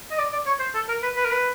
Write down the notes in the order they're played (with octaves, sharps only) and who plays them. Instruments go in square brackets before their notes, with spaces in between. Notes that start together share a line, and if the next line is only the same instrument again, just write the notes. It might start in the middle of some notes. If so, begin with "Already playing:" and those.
[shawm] D#5
D5
D5
C#5
C5
A4
A#4
B4
B4
A#4
B4